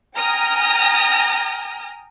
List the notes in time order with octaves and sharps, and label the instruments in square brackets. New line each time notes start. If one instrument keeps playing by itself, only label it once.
[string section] G5 G#5 A#5 D#6 F6 A#6